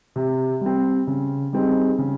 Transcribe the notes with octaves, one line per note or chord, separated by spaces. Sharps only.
C3
G3 C4
C#3
G3 C4 D#4 G#4
C#3